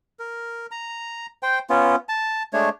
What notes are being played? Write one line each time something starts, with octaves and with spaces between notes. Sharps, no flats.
A#4
A#5
C5 G5
B3 C#4 F4
A5
G#3 A3 D4 C#5